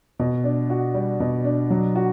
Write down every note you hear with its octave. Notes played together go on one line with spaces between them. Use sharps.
B2
D4
F#4
G3
B2
D4
F#3
F#4